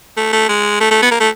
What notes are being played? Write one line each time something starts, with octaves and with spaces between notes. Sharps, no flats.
A3
A3
G#3
A3
A3
B3
A#3
A3